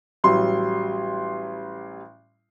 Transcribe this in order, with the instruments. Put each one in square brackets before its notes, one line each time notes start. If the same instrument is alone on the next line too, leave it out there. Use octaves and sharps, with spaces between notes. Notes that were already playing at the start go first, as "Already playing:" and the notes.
[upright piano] A1 F#3 G3 C6